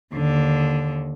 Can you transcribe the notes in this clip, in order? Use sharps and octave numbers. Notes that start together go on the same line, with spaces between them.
D#2 D3